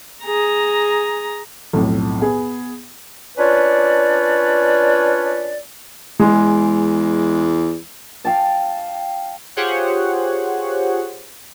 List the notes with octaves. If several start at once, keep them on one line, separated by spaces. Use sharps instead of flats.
G#4 A#5
B1 F2 A2
B3 G#4
C#4 D4 F4 B4 C#5 D5
E2 G#3
F5 G5 A5
F4 G4 G#4 C5 C#5 F#5